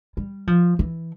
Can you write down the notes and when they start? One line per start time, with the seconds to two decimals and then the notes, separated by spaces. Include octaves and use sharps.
0.17 G3
0.47 F3
0.79 E3